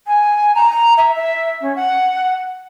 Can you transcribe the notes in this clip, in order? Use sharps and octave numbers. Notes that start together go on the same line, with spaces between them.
G#5
A#5
E5
E5
C#4
F#5